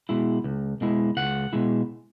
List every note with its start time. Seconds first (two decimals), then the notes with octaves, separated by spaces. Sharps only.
0.09 B2 G#3 E4
0.44 C#2
0.81 B2 G#3 E4
1.17 C#2 F#5
1.53 B2 G#3 E4